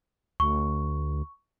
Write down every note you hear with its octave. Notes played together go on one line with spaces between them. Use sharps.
D2 C#6